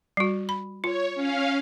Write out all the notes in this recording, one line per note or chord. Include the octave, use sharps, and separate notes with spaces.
G3 F#4
B5
F4 C#5
C#4 F5